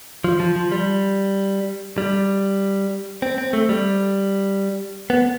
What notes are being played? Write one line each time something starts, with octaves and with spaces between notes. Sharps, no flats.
F3
F3
F3
G3
G3
C4
C4
A3
G3
B3